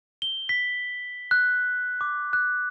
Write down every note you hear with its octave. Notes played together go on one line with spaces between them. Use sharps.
G7
B6
F#6
D6
F#6